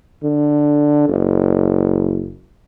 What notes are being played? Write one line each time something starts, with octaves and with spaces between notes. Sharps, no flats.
D3
F#1